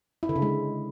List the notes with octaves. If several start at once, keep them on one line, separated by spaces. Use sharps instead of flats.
E4
D3
C#3
G#3